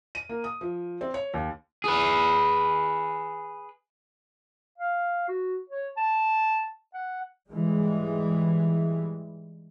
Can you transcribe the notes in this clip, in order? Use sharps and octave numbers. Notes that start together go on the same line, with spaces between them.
D#7
A#3
D#6
F3
C4
C#5
D#2
G#4 B4
F5
F#4
C#5
A5
F#5
G#2 E3 G3 G#3